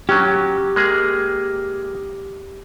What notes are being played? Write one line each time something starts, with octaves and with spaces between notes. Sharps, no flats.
F#3 C#4 G4
G#3 A#3 G#4